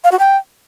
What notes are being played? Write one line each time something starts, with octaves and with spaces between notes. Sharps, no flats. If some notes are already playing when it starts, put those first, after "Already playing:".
F5
F#4
G5